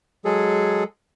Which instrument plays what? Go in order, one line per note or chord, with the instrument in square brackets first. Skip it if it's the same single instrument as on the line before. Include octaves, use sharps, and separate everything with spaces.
[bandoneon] F#3 G#3 G#4 A4